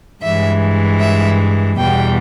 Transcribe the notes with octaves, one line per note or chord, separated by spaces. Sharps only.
G2 E3 G#3 E5
E5
E2 B2 G3 G5